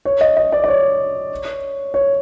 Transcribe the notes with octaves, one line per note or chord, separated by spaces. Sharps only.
C#5
D#5
D#5
D5
D5
C#5
C#5